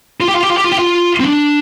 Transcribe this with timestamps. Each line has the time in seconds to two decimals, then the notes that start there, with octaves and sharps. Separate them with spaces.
0.21 F4
0.28 G4
0.35 F4
0.43 G4
0.49 F4
0.57 G4
0.64 F4
0.72 G4
0.79 F4
1.20 C4
1.25 D4